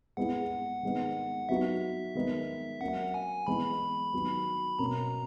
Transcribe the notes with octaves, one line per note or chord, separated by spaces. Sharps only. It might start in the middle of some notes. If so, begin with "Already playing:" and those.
G#3 B3 E4 G#4 F#5
D#3 G#3 B3
F#3 B3 D#4 F#4 E5
D#3 G#3 B3 D#4
F#3 A#3 C#4 F#5
G#5
E3 G#3 B3 E4 B5
D#3 F#3 B3 F#4
B2 A#3 C#4 A#5